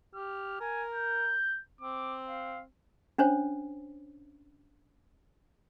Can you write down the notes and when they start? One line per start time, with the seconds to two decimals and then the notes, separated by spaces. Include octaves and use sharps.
0.15 G4 F6
0.61 A#4 G#5
0.95 G6
1.81 C4 D6
2.28 F5
3.18 C#4 D4 C5 C#5